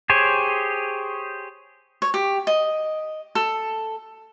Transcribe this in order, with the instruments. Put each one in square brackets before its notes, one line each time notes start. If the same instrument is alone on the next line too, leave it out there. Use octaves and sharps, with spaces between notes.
[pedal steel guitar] G4 G#4 C5 C#5
[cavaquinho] C#5
G4
D#5
A4